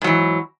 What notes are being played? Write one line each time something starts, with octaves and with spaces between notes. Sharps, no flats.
G#2 E3 F#3